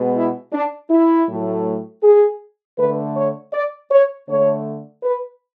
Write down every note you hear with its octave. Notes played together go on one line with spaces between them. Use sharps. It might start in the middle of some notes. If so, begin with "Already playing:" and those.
Already playing: B2 G#3 B3
E4
D4
E4
A2 F#3 A3
G#4
D3 A3 B4
C#5
D5
C#5
D3 A3 C#5
B4